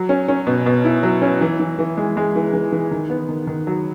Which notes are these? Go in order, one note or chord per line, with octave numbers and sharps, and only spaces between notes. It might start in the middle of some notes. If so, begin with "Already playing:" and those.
Already playing: F#3
C#4
C#4
B2
B2
E4
F#3
C#4
E3
E3
E3
G#3
G#3
E3
E3
E3
D#3
B3
D#3
D#3
F#3